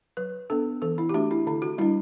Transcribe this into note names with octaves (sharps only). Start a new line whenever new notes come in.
F#3 B4
B3 D4 A4
E3 A4
E4
G4
A3 D4 F#4
E4
D3 E4
F#4
G3 D4 E4